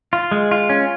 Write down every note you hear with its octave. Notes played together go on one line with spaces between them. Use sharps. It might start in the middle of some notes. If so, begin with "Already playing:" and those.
F4
G#3
F4
C#4